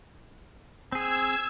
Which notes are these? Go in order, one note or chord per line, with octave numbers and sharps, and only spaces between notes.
C4 G#4 E6 G#6